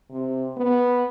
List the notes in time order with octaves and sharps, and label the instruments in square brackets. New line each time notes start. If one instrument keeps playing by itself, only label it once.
[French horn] C3
B3